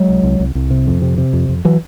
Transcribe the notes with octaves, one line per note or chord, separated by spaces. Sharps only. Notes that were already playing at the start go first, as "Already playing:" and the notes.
Already playing: F#3 G#3
C2
C2
C2
C2
C3
F2
C3
C3
F2
F2
E3 F#3